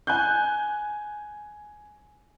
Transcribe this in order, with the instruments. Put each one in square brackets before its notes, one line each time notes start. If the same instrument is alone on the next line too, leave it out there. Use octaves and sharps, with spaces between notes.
[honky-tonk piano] G#5 F#6 G6